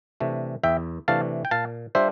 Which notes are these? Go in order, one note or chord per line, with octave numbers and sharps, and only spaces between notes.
C3 E3 A3 D4
E2 E5 G5
C3 E3 A3 D4 F5 A5
G5
A#2 F5 A5
G3 D4 F4 C5 E5